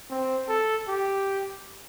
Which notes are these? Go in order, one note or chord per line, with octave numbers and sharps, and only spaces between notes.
C4
A4
G4